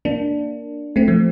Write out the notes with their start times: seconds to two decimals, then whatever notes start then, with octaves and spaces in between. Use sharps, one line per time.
0.05 A#3 D4
0.96 A3 C4
1.08 F3 A3